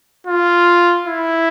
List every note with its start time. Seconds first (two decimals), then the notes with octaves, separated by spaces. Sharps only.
0.27 F4
1.07 E4